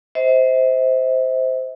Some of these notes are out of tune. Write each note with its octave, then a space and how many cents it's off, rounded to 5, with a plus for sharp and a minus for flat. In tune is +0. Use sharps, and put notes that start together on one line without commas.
C5 -10 E5 -45